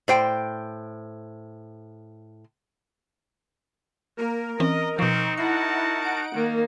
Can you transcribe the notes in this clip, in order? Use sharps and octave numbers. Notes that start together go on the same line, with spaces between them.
A2 C5 G5
A#3 A#4
E3 C4 C#4 D#5
B2 F3 C4 D#4 C#6
E4 F#4 A#4 F#5 A5 C7
F#5 D7
D#3 A#3